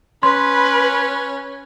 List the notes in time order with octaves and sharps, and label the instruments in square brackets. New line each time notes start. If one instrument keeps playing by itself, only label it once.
[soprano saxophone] C#4 [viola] B4 [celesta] C6